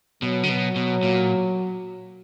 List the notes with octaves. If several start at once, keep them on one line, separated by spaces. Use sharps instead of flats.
B2 F#3
D3
B2
B2
A#2